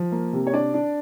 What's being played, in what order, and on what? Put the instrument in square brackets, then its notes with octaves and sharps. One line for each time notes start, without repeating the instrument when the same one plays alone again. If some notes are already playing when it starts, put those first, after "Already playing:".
Already playing: [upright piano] F3
A#3
C3
C#5
D4 D5
D4